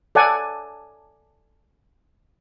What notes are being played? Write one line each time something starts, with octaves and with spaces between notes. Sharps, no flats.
A4 D5 F#5 G#5